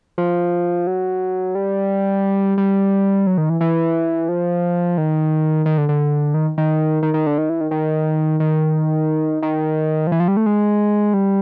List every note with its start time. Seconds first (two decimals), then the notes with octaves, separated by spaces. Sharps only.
0.18 F3
0.87 F#3
1.55 G3
2.58 G3
3.27 F#3
3.38 D#3
3.50 E3
3.61 E3
4.29 F3
4.98 D#3
5.66 D#3
5.78 D3
5.89 D3
6.34 D#3
6.58 D#3
7.03 D#3
7.14 D#3
7.27 D3
7.38 D#3
7.49 E3
7.61 D#3
7.71 D#3
8.40 D#3
9.43 D#3
10.07 F3
10.12 E3
10.20 F3
10.28 G3
10.37 A3
10.46 G#3
11.14 G3